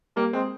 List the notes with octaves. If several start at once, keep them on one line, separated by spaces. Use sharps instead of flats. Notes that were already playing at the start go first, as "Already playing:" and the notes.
G3 A#3
G#3 C4